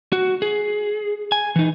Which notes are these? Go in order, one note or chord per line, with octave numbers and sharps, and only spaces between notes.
F#4
G#4
G#5
E3 D#4